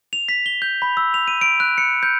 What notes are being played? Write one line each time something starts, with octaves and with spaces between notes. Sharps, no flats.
F7
B6
G7
G6
B5
E6
F7
D#7
D7
F#6
C#7
G6